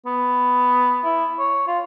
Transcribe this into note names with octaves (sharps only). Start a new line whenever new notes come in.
B3
E4
C#5
F4